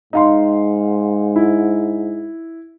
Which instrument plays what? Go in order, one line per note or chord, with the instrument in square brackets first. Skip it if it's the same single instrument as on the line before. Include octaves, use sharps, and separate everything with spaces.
[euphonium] G#2 [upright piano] D#4 F5 C6
[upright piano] E4